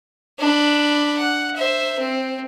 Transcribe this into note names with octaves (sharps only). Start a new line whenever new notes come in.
D4 B5
F#5
C5 E5
C4